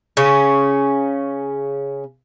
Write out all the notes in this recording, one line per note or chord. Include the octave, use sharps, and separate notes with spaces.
C#3 C#4